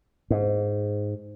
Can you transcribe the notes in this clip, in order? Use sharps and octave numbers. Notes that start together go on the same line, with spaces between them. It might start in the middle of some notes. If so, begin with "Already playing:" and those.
G#2